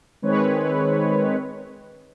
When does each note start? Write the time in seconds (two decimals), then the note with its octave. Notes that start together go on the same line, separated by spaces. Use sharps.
0.22 D#3 G#3 C4 B4 C#5